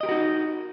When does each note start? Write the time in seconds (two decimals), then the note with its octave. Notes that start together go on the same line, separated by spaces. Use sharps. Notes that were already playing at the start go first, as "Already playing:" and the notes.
0.01 D#5
0.03 G4
0.06 A#4
0.09 F#4
0.11 D#4